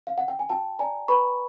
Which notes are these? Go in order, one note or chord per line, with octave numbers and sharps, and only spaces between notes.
F5
F#5
G5
G#5
F#4 G5 A5
D5 G#5 A#5
B4 B5 C#6